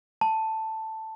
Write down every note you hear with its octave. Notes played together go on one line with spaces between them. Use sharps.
A5